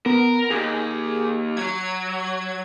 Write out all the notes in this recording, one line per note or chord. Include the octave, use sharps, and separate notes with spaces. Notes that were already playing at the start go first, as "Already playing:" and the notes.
B3 A#4
D#2 G#4
F#3 G#6